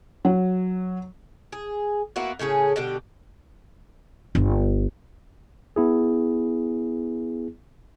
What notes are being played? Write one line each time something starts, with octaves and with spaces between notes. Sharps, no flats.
F#3
G#4
A#3 B3 E4 F#4
A2 C#3 C#4 G#4
B2 D3 G3 G4
G1
B3 E4 G#4